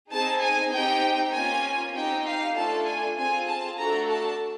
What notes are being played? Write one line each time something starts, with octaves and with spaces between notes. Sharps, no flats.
C4 D#4 G#4 A5
G#5
C4 D#4 G4 G5
A#3 C#4 F4 G#5
C4 D#4 G4 G5
F5
A3 D4 F4 A4 A5
G#5
C4 F4 G#4 G#5
A5
A3 D4 F#4 A4 A#5
A5